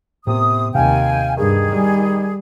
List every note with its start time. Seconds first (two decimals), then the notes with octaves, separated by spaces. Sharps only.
0.27 A2 C3 B3 D#6
0.75 D#2 C3 F5 G5 G#5
1.37 G2 D#3 G#4
1.71 G3